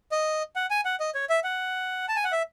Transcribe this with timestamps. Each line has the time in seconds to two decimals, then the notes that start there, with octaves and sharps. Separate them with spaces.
0.12 D#5
0.56 F#5
0.71 G#5
0.85 F#5
1.00 D#5
1.15 C#5
1.30 E5
1.44 F#5
2.08 A5
2.16 G#5
2.24 F#5
2.32 E5